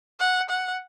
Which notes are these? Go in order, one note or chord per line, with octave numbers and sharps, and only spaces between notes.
F#5
F#5